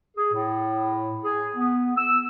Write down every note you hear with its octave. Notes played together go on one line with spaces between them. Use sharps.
G#4
A2
G#4
B3
E6